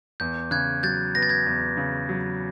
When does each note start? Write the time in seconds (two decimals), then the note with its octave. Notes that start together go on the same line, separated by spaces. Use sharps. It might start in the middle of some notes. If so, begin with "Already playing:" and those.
0.20 E2 G6
0.51 C#3 F#6 G#6
0.83 F#3 G6 A6
1.15 B3 A#6
1.23 A6
1.29 G#6 A#6
1.46 E2
1.77 C#3
2.09 F#3